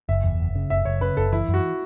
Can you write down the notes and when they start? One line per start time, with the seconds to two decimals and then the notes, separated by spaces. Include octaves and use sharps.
0.09 F#1 E5
0.24 E2
0.40 F#1
0.55 C#3
0.70 F#1 E5
0.85 F#1 C#5
1.01 C#3 B4
1.17 F#1 A4
1.33 E3 E4
1.48 F#2
1.54 F#4